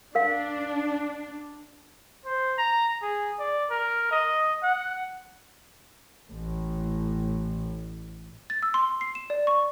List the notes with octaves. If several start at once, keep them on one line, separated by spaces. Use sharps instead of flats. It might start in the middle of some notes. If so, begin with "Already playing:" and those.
D4 A#4 F5
C5
A#5
G#4
D5
A#4
D#5
F#5
A1 A2
A6
E6
C6
C7
E7
D5
C#6